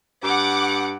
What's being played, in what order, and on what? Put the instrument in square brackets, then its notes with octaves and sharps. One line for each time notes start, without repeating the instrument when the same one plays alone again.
[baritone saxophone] G2 [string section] F#5 D6